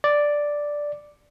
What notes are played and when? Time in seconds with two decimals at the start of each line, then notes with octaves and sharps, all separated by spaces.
0.04 D5